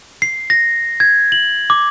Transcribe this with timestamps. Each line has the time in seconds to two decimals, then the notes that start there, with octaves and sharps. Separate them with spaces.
0.22 C7
0.50 A#6
1.00 G#6
1.32 F#7
1.70 D6